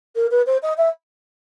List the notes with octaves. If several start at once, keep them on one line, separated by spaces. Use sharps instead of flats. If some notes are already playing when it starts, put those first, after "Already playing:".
A#4
B4
C5
D#5
E5